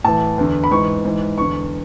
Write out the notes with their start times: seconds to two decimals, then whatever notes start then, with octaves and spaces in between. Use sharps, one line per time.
0.04 A2 E3 A5
0.38 E2 D3
0.64 B5
0.71 G#2 E3 C#6
1.04 G#2 E3
1.38 E2 D3 C#6